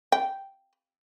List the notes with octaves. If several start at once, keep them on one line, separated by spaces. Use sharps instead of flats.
G5